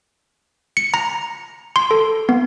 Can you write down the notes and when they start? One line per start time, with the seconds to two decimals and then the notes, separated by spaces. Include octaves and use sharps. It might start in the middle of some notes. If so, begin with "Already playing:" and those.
0.77 C#7
0.94 A#5
1.76 C6
1.91 A4
2.29 B3